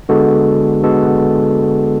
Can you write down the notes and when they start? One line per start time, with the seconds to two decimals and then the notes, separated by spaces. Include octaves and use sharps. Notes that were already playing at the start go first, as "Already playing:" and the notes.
0.09 D3 G#3 B3 F#4 A4
0.83 D3 G#3 B3 F#4 A4